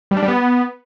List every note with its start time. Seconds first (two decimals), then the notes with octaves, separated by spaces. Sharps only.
0.11 G3
0.17 D4
0.22 G3
0.28 B3